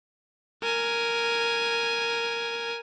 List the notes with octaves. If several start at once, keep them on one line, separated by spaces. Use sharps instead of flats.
A#4 G#5